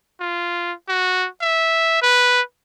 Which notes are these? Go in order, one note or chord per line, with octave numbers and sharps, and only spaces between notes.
F4
F#4
E5
B4